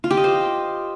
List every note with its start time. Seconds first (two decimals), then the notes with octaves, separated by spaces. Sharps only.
0.04 F4
0.11 G4
0.17 D#5
0.24 C5